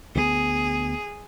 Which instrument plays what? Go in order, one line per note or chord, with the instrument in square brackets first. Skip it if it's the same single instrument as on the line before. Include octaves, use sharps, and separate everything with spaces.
[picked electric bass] D2 G3 B3 [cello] G#4